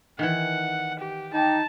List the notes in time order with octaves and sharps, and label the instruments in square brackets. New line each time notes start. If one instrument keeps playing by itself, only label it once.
[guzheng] D#3 E3 [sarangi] F#5
[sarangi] G4
[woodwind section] D#4 [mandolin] G5 A#5 D6 [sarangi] A5